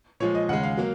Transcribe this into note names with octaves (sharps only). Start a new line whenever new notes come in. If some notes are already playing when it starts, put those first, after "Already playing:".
A#2 F3 G#3 C#5
D#5
D#2 C#3 G#3 F#5
F5
F#3 A#3